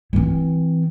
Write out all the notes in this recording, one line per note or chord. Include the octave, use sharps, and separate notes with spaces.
E3 C4